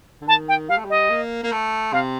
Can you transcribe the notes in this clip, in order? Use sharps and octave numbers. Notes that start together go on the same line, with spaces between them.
D3
D#3 A5
G5
G3 F5
A3
G3
D#5
A#3
A#3
A3
C3 F5